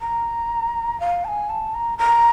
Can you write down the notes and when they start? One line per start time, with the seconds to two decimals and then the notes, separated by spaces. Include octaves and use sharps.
0.01 A#5
1.00 F5
1.25 A5
1.28 G#5
1.50 A5
1.74 A#5
1.98 A#5